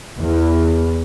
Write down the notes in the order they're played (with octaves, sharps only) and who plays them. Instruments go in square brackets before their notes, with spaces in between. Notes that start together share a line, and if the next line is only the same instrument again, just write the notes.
[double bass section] E2